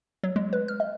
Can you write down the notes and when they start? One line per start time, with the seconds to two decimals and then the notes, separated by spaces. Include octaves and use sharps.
0.23 F#3
0.36 G#3
0.53 B4
0.68 F6
0.80 D#5